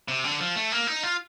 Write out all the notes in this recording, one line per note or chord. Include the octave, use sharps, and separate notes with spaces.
C3
D3
F3
A3
A#3
D#4
F4